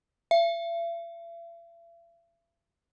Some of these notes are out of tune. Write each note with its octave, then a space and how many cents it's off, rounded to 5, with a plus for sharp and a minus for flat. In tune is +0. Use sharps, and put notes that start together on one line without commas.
E5 +45